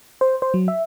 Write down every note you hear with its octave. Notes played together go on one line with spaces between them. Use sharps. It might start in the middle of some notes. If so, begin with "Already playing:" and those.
C5
C5
F#3
E5